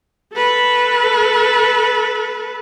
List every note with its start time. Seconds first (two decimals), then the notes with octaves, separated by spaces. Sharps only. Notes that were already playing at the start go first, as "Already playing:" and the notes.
0.33 A4 B4